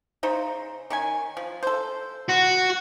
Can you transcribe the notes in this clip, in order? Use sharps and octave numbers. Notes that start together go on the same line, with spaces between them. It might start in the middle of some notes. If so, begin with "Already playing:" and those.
C#3 D#4 C5
D#3 C#4 G#5
F3
A4 C5
F#4